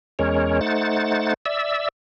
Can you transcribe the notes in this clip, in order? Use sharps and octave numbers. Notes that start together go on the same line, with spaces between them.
E2 G#3 C#4 A#4 C#5
A3 D#4 C5 F#5 A6
D5 E5 E6